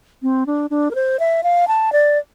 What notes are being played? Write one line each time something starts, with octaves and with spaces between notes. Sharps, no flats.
C4
D4
D4
A#4
C5
E5
F5
A5
D5